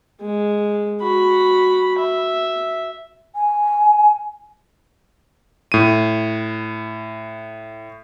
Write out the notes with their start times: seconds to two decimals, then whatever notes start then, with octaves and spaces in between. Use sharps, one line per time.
0.21 G#3
1.02 F#4 B5
1.99 E5
3.35 G#5
5.72 A2 D#7